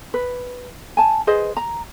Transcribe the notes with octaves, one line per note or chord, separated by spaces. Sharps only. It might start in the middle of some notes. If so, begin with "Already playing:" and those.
B4
G#5 A5
G#4 B4 C5 D#5
A#5